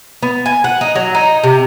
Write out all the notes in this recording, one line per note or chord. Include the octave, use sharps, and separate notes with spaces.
B3
G#5
F#5
D#4
F#3
D#4
C3